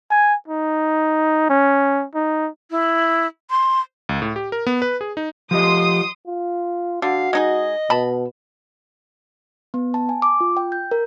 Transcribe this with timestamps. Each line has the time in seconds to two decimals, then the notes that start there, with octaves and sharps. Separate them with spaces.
0.10 G#5
0.48 D#4
1.50 C#4
2.14 D#4
2.70 E4
3.50 C6
4.09 C#2
4.22 A2
4.36 G4
4.52 A#4
4.67 B3
4.82 B4
5.01 G#4
5.17 D#4
5.51 F3 G4 D#5 C6 D#6
6.27 F4
7.02 D3 F#4 F5
7.33 G#3 D#4 G#4 D#5
7.90 B2 A5 B5
9.74 B3
9.94 A5
10.09 G#5
10.22 D6
10.41 F4
10.57 G5
10.72 G6
10.91 A#4